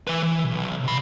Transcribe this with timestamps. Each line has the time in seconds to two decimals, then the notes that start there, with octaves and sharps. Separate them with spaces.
0.07 E3 B4
0.23 E3
0.45 B1
0.84 C3 B5